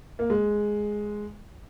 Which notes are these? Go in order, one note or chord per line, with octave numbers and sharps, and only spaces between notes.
A#3
G#3